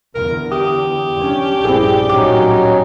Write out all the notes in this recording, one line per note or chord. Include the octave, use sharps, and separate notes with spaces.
E2 D3 A#4
G4 D#6
C#4 D4
A#1 G2 G3 C4 E4 G#4
A1 A#2 F#3 C#4 D#4 D6